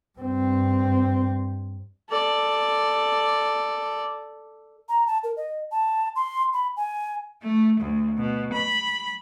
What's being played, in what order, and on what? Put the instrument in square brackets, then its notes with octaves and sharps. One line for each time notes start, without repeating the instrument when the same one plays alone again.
[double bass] G2 C4
[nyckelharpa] A4 D5
[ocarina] A#5
A5
A#4
D#5
A5
C6
B5
G#5
[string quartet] A3
D2
B2
B5